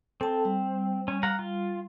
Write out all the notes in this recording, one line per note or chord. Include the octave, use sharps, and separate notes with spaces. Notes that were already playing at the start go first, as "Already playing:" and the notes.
C4 A4 A5
G3
C#4
F5 F#5 A#5
F4